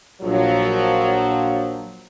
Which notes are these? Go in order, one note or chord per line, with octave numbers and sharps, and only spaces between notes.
A#1 F3 F#3